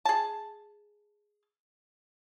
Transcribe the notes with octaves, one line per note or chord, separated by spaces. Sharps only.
G#4 A5